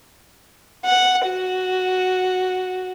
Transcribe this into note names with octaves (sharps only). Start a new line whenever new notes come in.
F#5
F#4